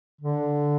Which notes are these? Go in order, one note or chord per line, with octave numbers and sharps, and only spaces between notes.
D3